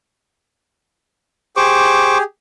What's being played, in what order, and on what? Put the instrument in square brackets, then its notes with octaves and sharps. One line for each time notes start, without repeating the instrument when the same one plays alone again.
[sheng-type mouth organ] G4 G#4 [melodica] C5 C#6 D6